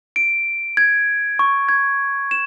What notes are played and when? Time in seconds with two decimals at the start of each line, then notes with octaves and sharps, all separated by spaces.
0.16 D7
0.77 G#6
1.39 C#6
1.69 G#6
2.31 E7